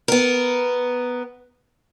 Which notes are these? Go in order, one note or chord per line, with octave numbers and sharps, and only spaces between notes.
B3 A#4